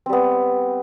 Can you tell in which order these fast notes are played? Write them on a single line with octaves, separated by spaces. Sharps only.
C4 G3 B3